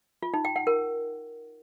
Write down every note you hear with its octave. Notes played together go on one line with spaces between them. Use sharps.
F4
D#4
G5
F#5
A#4